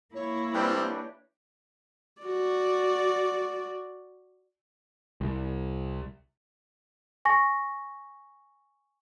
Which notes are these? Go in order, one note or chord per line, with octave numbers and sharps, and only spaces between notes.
A#3 E4 C#5
E3 G3 C4 D4 G4
F#4 D5
C2
G#5 C#6 A#6